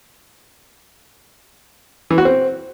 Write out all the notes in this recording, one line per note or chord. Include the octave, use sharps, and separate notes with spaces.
E3
F#4
C4